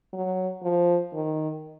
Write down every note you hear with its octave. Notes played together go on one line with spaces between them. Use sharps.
F#3
F3
D#3